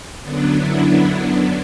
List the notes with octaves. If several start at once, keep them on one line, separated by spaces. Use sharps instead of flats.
F#2 D3 F#3 B3 D4
E4